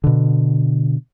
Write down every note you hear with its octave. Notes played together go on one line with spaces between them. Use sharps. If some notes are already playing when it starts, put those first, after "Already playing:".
B2 D3